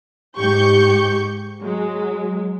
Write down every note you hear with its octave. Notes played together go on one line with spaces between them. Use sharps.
G#2 G4 C#6 G6
F#3 G#3